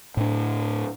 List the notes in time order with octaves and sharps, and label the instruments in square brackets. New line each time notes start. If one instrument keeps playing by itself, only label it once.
[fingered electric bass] A2 D4